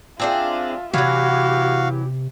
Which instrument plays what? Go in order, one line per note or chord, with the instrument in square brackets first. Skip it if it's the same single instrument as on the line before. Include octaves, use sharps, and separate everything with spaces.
[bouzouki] C4 D4 G#4 [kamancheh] F4 E5
[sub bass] C3 [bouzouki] E3 F#3 [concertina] F#4 F5 [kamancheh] G4